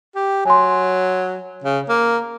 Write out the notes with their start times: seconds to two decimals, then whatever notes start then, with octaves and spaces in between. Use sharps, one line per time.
0.15 G4
0.46 F#3 G#5 C6
1.64 C#3
1.89 A#3